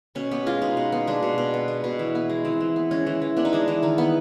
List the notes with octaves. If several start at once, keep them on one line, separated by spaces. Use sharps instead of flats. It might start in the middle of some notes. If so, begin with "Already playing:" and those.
B2 C#4
B3 G4
G#3 F4
B2 D#4
B2
B3
G#3 D4
B2
B2
B3
G#3
B2
E3
B3
G#3
E3 C4
E3
B3
G#3 C#4
E3
E3
B3 D4
D#4
G#3 D4
E3
D#3 D#4
B3